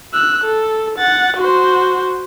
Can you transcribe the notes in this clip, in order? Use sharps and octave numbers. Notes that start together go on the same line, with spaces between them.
E6 F#6
A4
F#5 A6
F#4 C5